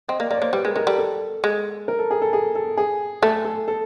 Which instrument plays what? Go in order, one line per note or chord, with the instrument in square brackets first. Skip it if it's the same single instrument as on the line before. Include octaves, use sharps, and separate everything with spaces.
[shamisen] C4 [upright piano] D#5
[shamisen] A#3 [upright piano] D5
[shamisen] A#3 [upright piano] D5
[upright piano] C#5
[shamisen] A#3 [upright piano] C5
[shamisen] G3 [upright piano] B4
[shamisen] G#3 [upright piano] A#4
[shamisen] G#3 [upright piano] A#4
[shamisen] G3 [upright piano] A4
[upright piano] A4
[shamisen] G#3
[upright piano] A#4
A4
G#4
A4
G#4
A4
G#4
[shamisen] A3 [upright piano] A4
[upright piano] A4
A4